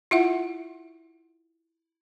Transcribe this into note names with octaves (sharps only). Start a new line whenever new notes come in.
E4 F4 E5 F#5